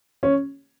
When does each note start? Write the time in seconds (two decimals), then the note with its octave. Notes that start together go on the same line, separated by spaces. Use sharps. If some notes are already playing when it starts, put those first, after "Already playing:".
0.23 C#4